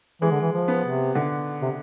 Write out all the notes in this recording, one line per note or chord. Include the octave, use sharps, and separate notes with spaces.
E3 G#3
D3
E3
F3
B3
C3
D3
C3